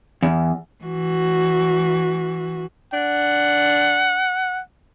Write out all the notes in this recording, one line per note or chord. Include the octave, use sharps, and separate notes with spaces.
E2
E3 F#4
D4 F#5